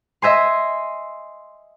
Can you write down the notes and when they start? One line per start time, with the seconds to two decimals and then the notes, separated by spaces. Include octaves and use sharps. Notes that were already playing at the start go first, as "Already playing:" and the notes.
0.22 D#5 E5 G#5 C6